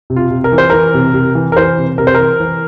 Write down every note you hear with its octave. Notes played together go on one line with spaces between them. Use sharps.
C3
F4
C3
A#4
E3
C5
E3 A#4
C3
C3
E3
A#4
E3 C5
C3
C3 A#4
C5
E3 A#4
E3